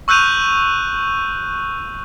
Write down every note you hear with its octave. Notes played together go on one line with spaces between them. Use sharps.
C#6 E6 F#6 G6 D#7 F7